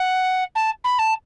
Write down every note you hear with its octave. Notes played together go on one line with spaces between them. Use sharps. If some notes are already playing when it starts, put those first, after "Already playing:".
Already playing: F#5
A5
B5
A5